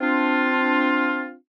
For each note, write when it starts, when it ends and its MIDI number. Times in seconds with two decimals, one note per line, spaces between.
0.01 1.34 60
0.01 1.34 62
0.01 1.34 65